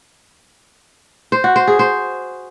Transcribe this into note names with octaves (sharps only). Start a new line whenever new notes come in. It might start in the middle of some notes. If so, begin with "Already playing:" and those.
C5
F#4
C5
G#4
C5